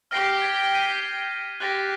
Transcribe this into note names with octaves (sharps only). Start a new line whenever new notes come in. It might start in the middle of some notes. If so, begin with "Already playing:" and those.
G4 G5 F6 A#6 C7
G#6 A6 B6
D#7
G4 F#6 A6 A#6